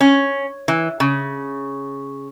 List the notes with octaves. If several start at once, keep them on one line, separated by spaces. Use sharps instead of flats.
C#4
E3
C#3